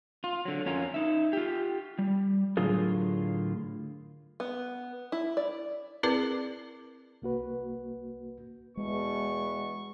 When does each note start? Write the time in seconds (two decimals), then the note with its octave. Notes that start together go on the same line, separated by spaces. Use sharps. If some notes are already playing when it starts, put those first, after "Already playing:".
0.24 F4
0.45 D3 F#3
0.66 F2 C#4 F4 A#4
0.94 D#4 E5
1.33 F4 G4
1.99 G3
2.57 A2 D3 F#3 F4 G#4 A#4
4.40 B3
5.12 E4
5.37 D5
6.03 C4 E4 G#4 A#4 B4 D5
7.22 C2 A#3 F#4 B4
8.77 E2 B2 G#3 C#6